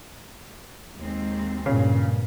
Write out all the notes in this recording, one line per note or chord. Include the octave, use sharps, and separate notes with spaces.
D#2 G#3 C4
G2 A#2 C#3